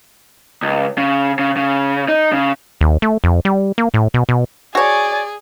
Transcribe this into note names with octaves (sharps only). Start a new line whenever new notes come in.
C#2
C#3
C#3
C#3
D#4
C#3
D#2
A3
F2
G3
A#3
A2
B2
B2
F#4 G#4 C#5 D5 G#5